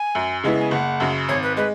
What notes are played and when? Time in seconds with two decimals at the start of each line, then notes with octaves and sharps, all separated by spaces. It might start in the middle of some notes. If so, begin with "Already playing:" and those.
Already playing: G#5
0.15 F#2
0.44 C#3 G#3 B3 E4
0.60 G#5
0.71 F#1 F#5
1.00 F#2 C#3
1.29 G#1 C#5
1.43 B4
1.57 G#3 B4